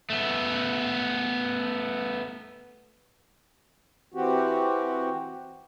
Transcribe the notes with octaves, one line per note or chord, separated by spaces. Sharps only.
A3 B3
E3 C4 F#4 G4